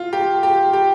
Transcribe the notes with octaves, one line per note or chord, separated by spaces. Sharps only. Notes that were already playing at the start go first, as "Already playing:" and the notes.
Already playing: F4
G4
G4
G4